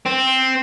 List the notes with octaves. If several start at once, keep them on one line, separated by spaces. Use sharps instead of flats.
C4